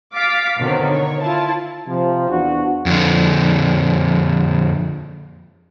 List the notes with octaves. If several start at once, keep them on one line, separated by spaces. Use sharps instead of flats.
F5 D6 A6 B6
B2 D3 D#3 F#3 B3 C4
C#5
E4 F4 A5
C3 F3
E2 D4 F#4
F2 D3